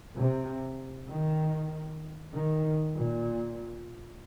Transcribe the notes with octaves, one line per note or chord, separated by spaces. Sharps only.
C3
D#3
D#3
A#2